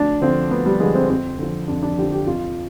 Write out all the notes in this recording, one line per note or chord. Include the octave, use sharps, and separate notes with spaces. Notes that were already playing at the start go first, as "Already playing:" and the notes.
Already playing: D2 D4
D3 F3 C4
D2 B3
G3
D3 F3 G#3
C4
F2 C4
D3 F3
F2 D4
D4
D3 F3 G4
G4
F2 F4